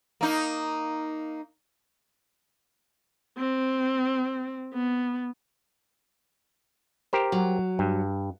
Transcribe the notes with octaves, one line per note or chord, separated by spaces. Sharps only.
A#3 D#4
C4
B3
G4 A#4 C5
F#3
G2